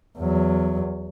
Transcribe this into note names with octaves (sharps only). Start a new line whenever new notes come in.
E2 F#3